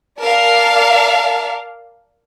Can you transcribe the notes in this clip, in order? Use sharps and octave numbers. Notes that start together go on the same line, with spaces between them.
A#4 D5 F5 A5